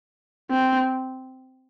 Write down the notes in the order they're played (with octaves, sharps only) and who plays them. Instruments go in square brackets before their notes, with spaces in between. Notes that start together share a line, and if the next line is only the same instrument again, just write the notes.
[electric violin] C4